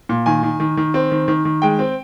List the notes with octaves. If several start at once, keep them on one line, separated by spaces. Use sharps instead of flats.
A#2
D#3 G#5
D#3
D#3
D#3
C4
D#3
D#3
D#3
G#3 G5
C4